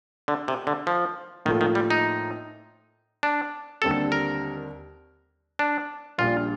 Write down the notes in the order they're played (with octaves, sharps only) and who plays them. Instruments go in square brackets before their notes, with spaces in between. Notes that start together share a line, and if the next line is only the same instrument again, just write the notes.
[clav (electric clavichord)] D3
C3
D3
F3
[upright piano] A2 F3 A#3 F4 A4 [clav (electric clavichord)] D#3
[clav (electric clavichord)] D#3
G3
D#4
D4
[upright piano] D#2 D3 G3 C4 G4 [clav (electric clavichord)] A4
[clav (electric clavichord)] A#4
D4
[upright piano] A#1 A#2 G3 D4 [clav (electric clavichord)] F4